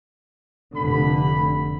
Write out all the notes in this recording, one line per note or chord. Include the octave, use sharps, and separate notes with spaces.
F1 D3 B5